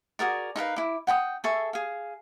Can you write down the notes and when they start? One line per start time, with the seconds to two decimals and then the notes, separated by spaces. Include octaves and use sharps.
0.19 F#4 G#4 A#4 D5
0.56 D#4 A#4 B4 F5
0.76 E4 D6
1.07 F#5 G5 A#5 D#6
1.44 G#4 A4 E5 C#6
1.73 G#4 F5